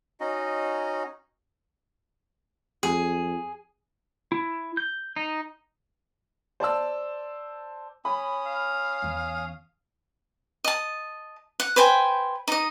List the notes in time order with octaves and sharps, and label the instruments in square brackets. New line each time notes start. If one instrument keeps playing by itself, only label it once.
[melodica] C#4 D#4 F#4 D#5
[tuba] F2 [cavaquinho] G#4
[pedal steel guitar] E4
G6
D#4
[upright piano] C5 D5 A5 E6
[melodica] C#4 D#6 [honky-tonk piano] B5
[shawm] F5
[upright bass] E2 E3
[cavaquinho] D#5 A5
F#5
B4 C5 G5 G#5
D#4 D#5